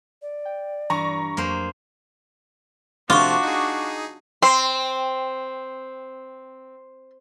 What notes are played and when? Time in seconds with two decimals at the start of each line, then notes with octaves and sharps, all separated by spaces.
0.22 D5
0.45 G5
0.90 G2 E3 A#5 C#6
1.37 F2 F#3 A#3 G#4 C5
3.10 C3 F3 A3 D4 F4 F#4 C#6 D6
3.43 D#4 G#4
4.42 C4 C6